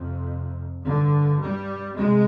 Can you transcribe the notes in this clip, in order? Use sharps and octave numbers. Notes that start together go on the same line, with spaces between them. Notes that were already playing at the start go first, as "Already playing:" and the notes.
Already playing: F2 C3
G2 D3
G3
C3 G#3